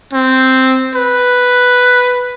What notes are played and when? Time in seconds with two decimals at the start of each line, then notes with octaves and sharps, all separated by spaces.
0.13 C4
0.95 B4